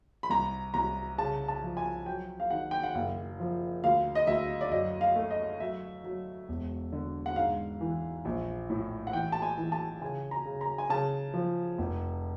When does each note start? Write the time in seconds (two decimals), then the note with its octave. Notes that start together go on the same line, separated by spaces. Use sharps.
0.23 B5
0.30 C2 A#5
0.74 C2 A#5
1.18 C#3 A5
1.48 A5
1.62 F3
1.77 G#5
2.06 F#3 G5
2.40 F5
2.50 D#3 F#5
2.71 G5
2.83 F#5
2.95 F#1 F5
3.40 F3
3.84 D2 F5
4.15 D#5
4.27 D2 E5
4.61 D5
4.71 F#2 D#5
5.01 F5
5.16 A3
5.31 D#5
5.60 F#3 E5
6.04 F#3
6.49 E1
6.93 D3
7.26 F#5
7.36 G#2 F5
7.81 E3
8.25 A#1
8.70 A2
9.07 F#5
9.13 E3 G5
9.32 A5
9.42 G#5
9.58 E3
9.72 A5
10.01 C#3 G#5
10.31 A#5
10.45 C#3
10.61 A#5
10.78 G#5
10.90 C#3 A5
11.34 F3
11.78 F1